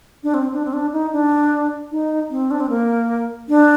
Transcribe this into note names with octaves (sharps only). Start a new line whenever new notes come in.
D4
C4
D4
C4
D4
D#4
D4
D#4
C4
D4
C4
A#3
D4